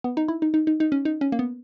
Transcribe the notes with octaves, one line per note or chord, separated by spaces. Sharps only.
B3
D#4
E4
D#4
D#4
D#4
D#4
C#4
D#4
C#4
A#3
B3